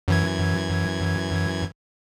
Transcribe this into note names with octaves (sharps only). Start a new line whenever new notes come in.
F#2 E3 G#6